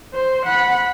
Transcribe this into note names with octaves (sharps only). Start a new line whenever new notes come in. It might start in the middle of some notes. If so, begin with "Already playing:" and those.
C5
F#5 B5